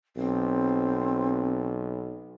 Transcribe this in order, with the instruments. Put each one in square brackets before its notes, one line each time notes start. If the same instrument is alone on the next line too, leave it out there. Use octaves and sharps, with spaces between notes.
[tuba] B1 [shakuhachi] C4